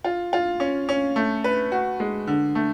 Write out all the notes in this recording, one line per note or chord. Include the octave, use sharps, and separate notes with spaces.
F4
F4
C#4
C#4
A3
B4
F#4
G#3
D3
A3